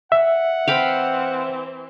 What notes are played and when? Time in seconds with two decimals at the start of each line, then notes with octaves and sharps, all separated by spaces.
0.12 E5 F#5
0.68 E3 C4 F5 G5 B5